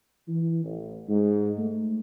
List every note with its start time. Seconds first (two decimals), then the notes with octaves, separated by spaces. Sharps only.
0.28 E3
0.64 A1
1.08 G#2
1.57 A3